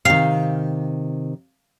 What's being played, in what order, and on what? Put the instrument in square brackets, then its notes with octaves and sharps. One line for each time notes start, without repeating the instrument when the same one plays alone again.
[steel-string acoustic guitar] C3 D#3 [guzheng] F5